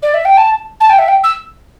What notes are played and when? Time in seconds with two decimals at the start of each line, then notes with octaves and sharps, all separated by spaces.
0.02 D5
0.14 E5
0.25 G5
0.37 A5
0.80 A5
0.89 G5
0.98 E5
1.08 G5
1.23 E6